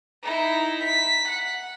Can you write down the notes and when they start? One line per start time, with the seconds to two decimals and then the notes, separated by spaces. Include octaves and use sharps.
0.23 D#4 E4
0.84 B6
1.28 F#5